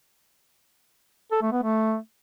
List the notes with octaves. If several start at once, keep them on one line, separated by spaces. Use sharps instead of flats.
A4
A3
B3
A3